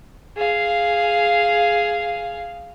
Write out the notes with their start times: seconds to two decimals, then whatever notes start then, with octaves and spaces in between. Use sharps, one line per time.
0.37 G#4 F5